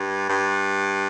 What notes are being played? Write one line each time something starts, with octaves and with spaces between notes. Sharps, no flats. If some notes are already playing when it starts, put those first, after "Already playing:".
Already playing: G2
G2